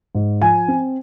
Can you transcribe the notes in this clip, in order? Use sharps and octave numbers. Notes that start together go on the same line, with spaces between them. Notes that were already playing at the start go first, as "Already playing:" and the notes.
G#2
F3 G#5
C4